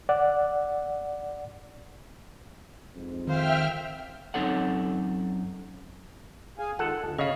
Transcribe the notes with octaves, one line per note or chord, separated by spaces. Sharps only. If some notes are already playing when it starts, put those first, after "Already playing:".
D5 F#5
F2 G#2
D#3 C5 E5 F5 G5 F6
F#2 C4 D#4 A4 C#5 F#5
G#4 F5 G#5
D#3 G#3 F4 A4 F#5
D2
C#3 D#5 F5